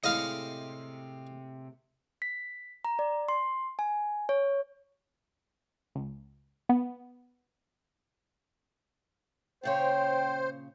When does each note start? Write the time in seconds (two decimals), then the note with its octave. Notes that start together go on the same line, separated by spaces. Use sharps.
0.04 A2 C3 G#3 D#5 F5
2.22 B6
2.85 A#5
2.99 D5
3.28 C6
3.79 G#5
4.29 C#5
5.95 C#2
6.69 B3
9.63 A#2 C#3 C5 C#5 G5